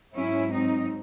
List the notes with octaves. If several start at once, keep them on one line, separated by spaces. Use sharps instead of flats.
G#2 F#3 C#4 E4
C4 D#4